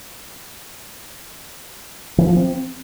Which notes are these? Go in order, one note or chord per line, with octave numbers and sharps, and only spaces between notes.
E3
F3
C4